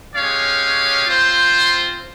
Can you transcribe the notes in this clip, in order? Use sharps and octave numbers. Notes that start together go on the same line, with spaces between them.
G#3 C#4 G4 C#5 F5
C4 F4 C5